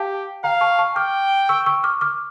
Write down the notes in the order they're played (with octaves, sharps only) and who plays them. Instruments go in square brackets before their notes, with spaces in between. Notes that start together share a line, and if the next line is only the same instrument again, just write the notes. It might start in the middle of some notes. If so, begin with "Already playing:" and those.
Already playing: [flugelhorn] G4 [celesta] F5 A5
[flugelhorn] F5 [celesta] G5 A#5
[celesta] A5 C#6
A5 C#6
[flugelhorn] G5 [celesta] D6 F6
[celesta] C#6 E6
C#6 E6
D6 F6
D6 F6